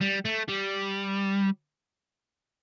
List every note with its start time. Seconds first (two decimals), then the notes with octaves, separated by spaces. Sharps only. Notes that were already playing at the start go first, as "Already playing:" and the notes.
0.01 G3
0.25 A3
0.49 G3